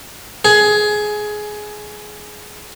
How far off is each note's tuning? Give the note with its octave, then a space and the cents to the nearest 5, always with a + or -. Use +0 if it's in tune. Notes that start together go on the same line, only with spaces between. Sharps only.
G#4 +15